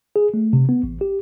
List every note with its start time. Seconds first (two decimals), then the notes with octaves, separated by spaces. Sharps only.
0.16 G#4
0.34 A3
0.53 C3
0.69 B3
0.83 A1
1.01 G4